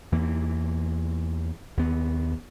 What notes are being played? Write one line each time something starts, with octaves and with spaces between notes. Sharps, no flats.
E2 E3 A#3
D#2 B3